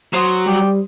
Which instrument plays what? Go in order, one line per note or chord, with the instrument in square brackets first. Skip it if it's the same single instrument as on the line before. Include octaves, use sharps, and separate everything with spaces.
[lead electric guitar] F#3 [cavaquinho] C5 C6 D#6
[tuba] G3 [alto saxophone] G4